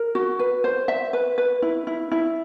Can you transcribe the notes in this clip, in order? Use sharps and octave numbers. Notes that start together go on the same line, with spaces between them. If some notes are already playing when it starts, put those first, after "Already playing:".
Already playing: A#4
F#4
B4
C5
E5
B4
B4
E4
E4
E4